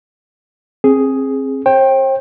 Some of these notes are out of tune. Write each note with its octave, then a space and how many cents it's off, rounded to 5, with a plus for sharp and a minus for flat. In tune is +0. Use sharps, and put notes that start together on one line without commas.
C4 +30 G#4 +5
C5 +40 G5 +5